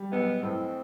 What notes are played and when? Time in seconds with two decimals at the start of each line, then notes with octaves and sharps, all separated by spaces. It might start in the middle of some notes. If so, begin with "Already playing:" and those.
Already playing: G3
0.12 B1 B3
0.42 A2 C4